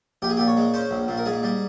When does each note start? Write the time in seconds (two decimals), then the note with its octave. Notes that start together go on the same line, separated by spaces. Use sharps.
0.22 A#1 G4
0.30 G#4
0.37 A#2 G4
0.48 C#5
0.57 G#3
0.74 C#4 C5
0.91 A#1
1.08 A#2
1.18 A#4
1.26 G#2 G#4
1.43 G3